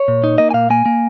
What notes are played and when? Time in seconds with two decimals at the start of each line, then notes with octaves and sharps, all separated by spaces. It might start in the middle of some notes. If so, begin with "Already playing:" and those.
Already playing: C#5
0.08 A#2
0.24 D#4
0.38 A#3 D#5
0.51 G#5
0.54 A#2 F5
0.70 A#3 G#5
0.86 A#3